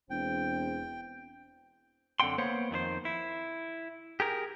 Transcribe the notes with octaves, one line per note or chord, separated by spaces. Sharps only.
E1 E2 C4 G5
F#2 D3 C4 F#5 G5 C6
A#3 B3 C5 C#5 F#5
F2 D#3 G#4 C5
E4
G4 G#4 A#4